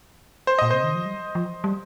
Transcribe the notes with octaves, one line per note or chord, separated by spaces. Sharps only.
C5
A#2 D#5
C3 C5
D#3
F3
G3
F3
G3